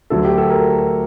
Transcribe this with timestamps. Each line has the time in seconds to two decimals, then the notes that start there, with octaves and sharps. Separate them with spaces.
0.10 D2 D3 F#3 A4
0.25 G4
0.38 A4
0.50 A#4